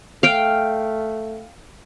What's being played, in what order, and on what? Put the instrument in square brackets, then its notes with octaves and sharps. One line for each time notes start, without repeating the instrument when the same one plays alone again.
[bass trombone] A3 [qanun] F5 G5